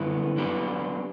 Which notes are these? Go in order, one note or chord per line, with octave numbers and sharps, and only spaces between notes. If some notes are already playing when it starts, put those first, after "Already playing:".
Already playing: F#2 D3 G3 B3 E4
F#3 B3 D4 G4 B4